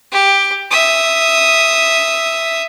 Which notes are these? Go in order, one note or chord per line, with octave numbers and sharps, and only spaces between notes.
G4
E5 D#6